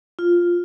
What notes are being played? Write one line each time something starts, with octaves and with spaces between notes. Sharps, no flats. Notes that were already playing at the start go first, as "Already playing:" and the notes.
F4